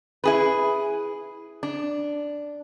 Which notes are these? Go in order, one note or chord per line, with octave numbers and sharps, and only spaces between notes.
E4 G#4 B4
D4